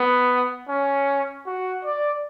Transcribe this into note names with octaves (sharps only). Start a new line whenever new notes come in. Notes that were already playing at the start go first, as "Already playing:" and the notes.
Already playing: B3
C#4
F#4
D5